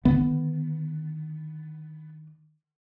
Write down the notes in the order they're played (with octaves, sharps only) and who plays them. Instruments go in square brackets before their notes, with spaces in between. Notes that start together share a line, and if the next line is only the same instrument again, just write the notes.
[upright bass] D3 D#3 [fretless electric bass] B3